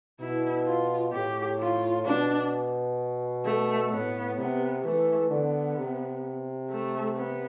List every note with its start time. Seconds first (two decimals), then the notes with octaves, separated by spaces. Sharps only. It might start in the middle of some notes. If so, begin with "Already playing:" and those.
0.20 B2 E4
0.67 F4
1.13 A2 G4
1.60 F4
2.06 B2 D4
3.45 A3
3.92 A2 B3
4.38 C3 B3
4.84 E3 A3
5.31 D3 B3
5.77 C3
6.70 A3
7.16 B3